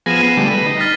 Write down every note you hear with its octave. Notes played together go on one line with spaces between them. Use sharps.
F3 B3 G#4 A#6 D#7 E7
B3 C7
D3 G3 A3
B4
D#4
F6 A6 B6